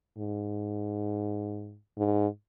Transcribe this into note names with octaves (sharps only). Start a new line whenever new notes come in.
G#2
G#2